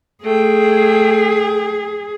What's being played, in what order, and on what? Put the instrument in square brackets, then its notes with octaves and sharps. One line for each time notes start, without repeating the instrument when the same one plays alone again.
[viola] A3 G5 [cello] G#4